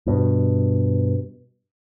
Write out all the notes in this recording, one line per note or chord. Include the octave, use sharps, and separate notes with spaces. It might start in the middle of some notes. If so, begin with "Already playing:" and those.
G2 B2